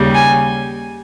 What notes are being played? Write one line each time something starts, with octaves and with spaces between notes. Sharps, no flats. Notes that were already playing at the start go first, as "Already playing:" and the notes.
Already playing: D#2 C#3 G3
G#5